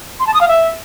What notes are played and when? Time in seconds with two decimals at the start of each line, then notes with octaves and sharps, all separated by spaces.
0.20 C6
0.27 A5
0.34 D#6
0.41 F5
0.48 E5